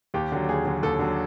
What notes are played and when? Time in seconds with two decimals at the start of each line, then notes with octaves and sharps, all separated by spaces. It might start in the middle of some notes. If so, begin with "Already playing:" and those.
0.14 D#2 G4
0.32 D3 F#3
0.49 D#2 G#4
0.65 D3 F#3
0.83 D#2 A4
0.99 D3 F#3